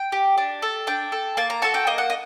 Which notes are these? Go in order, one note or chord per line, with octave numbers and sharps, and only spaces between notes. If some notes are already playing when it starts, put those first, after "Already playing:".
Already playing: G5
G4
D4
A4
D4 G5
A4
A#3 A5
A#5
F#4 A4 A5
G5
A#3 D#5
F#5
D#5